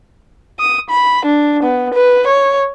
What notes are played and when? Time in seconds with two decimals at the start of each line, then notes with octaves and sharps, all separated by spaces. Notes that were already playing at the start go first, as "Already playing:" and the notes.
0.60 D#6
0.90 B5
1.25 D4
1.63 B3
1.94 B4
2.27 C#5